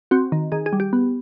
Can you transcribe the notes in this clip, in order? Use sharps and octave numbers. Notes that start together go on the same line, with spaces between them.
C4 F#4
D#3
D#3 G#4
G#4
G3
G4
B3